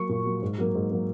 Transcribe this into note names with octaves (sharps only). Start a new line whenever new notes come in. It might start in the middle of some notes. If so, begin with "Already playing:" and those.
Already playing: F#3 A#3 C#6
A#2
F#3 A#3
G#2
F#3 A#3
G#2
F#3 A#3